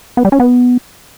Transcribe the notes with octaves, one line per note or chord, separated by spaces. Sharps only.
B3
G3
C#4
B3